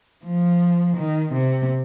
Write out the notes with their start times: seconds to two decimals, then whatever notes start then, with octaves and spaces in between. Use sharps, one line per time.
0.24 F3
0.97 D#3
1.33 C3